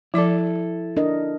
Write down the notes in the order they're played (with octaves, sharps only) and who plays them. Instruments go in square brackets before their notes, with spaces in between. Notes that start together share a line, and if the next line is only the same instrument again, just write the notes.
[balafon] F3 D5 D6 [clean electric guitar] E4 A4
[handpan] D4 A#4 D#5